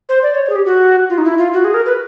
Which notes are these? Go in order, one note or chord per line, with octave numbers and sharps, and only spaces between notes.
C5
D5
C#5
C#5
G#4
G4
F#4
F4
D#4
E4
F4
F#4
G#4
A#4
B4